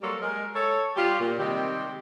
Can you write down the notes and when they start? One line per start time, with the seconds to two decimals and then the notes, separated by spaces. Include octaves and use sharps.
0.02 F#3 G3 A#3 A4 C5 C#5
0.22 G#3 A#4
0.55 A4 C#5
0.97 G3 F4 G4
1.20 A#2
1.39 C3 D#3 G3 G#3 C4 G4